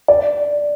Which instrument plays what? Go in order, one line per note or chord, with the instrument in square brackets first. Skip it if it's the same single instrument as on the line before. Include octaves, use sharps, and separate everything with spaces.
[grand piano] D5